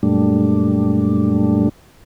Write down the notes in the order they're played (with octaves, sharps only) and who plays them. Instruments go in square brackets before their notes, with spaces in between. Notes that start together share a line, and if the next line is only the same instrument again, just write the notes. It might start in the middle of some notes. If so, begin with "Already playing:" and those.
[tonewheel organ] F#2 A#2 G3 A3 D4